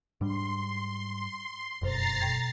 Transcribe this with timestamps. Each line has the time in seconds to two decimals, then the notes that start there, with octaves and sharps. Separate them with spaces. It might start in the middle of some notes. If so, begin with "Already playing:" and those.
0.21 G#2 G3 D4 C6
1.82 F1 F#2 B2 C5 A#5 A6 C7
2.21 B2 G5 G#6